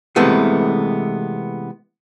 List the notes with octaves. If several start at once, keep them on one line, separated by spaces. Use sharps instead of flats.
C3 E3 G#3 A3 B3